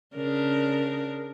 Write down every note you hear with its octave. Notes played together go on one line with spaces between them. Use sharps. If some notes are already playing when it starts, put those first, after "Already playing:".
C#3 D4 A#4